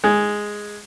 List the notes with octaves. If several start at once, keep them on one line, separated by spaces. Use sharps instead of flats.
G#3